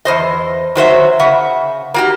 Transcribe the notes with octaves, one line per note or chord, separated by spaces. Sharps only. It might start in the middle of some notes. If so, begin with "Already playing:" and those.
E2 C5 D#5
D#3 F#3 C5 E5
C#3 E5 F#5
A#3 F#4 G4